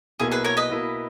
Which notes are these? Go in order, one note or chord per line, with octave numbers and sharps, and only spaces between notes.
B1 B2 A#3 E4 G#4
G#4 B4
A#4 C#5
B4 D#5
B2 A#3 E4